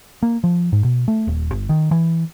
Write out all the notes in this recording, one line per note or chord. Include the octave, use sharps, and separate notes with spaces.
A#3
F3
G#2
B2
A3
D#1
G1
D#3
E3